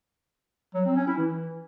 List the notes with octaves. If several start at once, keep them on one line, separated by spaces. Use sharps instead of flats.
F#3
C4
C#4
E4
E3